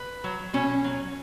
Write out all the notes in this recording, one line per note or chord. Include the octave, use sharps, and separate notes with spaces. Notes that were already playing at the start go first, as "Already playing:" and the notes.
Already playing: B4
F#3
B2 C#4
F#3